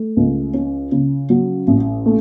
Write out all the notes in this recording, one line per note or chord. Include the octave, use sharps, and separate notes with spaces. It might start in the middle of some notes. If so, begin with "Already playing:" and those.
Already playing: A3
C#2
C#4
C#3
F#3
A1
A3